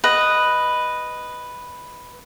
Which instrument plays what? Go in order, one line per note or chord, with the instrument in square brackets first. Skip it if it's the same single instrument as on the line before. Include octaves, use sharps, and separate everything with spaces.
[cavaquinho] B4 D#5